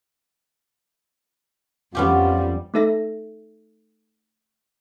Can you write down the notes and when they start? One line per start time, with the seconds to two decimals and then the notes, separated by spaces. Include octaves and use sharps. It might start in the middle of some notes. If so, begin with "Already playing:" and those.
1.95 F2 G3 B3 C#4 F4 G4
2.74 A3 D#4 A4 E5 A#6